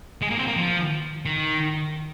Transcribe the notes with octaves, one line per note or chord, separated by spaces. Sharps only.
G#3
A#3
C4
A#3
F3
D#3